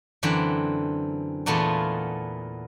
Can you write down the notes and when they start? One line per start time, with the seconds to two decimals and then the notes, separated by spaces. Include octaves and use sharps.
0.23 F#2 D3 E3 C4 B5
1.46 E2 A#2 A3 B3 F4 G#4